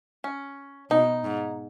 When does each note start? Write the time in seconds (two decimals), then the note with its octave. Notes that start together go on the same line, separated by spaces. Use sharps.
0.24 C#4
0.90 B2 D#4
1.24 G#2